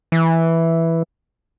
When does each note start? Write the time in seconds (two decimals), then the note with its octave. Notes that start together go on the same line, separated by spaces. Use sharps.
0.12 E3